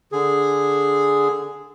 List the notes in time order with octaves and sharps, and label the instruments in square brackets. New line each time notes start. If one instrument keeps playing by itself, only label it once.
[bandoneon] D3 G#4